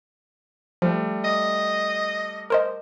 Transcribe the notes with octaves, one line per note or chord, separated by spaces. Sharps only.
F3 G3 A3
D#5
A#4 C5 D#5